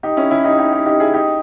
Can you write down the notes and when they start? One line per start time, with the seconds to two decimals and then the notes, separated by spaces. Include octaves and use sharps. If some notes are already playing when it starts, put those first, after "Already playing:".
0.03 D#4 G4
0.17 C#4 E4
0.31 C#4 E4
0.44 D#4 G4
0.52 E4
0.58 D#4 G4
0.72 D#4 G4
0.86 D#4 G4
1.00 E4 G#4
1.14 D#4 G4